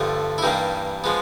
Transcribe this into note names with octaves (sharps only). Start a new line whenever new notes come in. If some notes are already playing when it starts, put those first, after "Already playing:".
Already playing: G2 D3 F3 A3
E4
G2 E3 G3 A#3 D#4
F3 G#3 B3